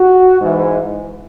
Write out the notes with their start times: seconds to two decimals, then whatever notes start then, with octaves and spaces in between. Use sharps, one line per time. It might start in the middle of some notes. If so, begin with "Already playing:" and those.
Already playing: F#4
0.40 G#2 E3